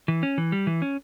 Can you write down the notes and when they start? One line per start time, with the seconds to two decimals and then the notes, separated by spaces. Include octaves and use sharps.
0.08 E3
0.23 C#4
0.38 E3
0.52 G3
0.67 E3
0.82 C#4